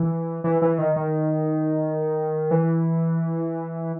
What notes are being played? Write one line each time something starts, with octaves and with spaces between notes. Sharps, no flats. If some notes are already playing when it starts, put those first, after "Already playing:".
Already playing: E3
E3
E3
D#3
D#3
E3